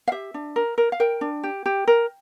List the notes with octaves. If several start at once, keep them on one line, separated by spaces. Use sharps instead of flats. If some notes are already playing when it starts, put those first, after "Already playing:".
F5
G4 E5
D4
A#4
A#4
F5
A#4 G5
D4
G4
G4
A#4